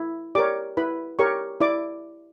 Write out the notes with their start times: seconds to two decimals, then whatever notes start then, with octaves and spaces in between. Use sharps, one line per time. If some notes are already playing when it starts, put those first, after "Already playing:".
Already playing: E4
0.35 G4 A#4 C#5 D5 D6
0.77 E4 B4 B5
1.19 G4 A#4 C#5 C#6
1.61 E4 D5 D6